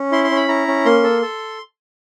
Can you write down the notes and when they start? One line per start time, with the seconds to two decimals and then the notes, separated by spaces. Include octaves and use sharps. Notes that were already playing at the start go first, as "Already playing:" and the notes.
Already playing: C#4
0.12 E4 C6
0.24 C6
0.31 C#4
0.36 B5
0.48 E4 A#5
0.68 C#4
0.85 A#3 C6
1.03 A4
1.22 A4